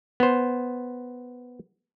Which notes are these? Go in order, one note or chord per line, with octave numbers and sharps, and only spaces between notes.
B3 C5